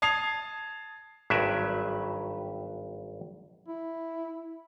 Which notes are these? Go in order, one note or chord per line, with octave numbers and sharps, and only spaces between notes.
A5 D#6 G#6 C7 F7
G#1 G2 F#3 G4 B4 E5
E4